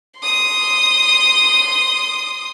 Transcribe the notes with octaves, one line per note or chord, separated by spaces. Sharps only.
C6 D#6